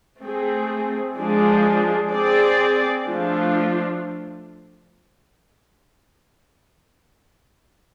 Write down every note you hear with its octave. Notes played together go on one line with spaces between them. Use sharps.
A3 C4 G#4
F3 G#3 D4 G#4
C4 G#4 D5
F3 A3 D4 F4